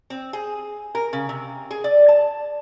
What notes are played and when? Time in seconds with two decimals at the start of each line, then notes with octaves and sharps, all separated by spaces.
0.10 C4
0.33 G#4
0.95 A#4
1.13 C#3
1.29 C3
1.71 G#4
1.84 D5
2.08 A5